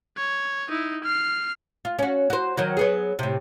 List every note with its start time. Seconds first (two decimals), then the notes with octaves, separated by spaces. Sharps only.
0.17 C#5
0.69 D#4 E4
1.04 F6 C7
1.85 F4
1.99 C#4 F#4
2.30 F#4 C5
2.57 D#3 F#3 F#4
2.77 F#3 B3 G#4
3.19 A2 C3